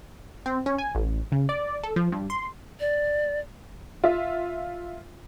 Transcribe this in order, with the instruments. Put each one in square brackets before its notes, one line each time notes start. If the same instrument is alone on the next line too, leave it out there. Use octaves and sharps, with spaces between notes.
[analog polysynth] C4
C#4
G#5
A1
C#3
D5
A4
F3
G2
C6
[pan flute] D5
[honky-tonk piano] F4 E5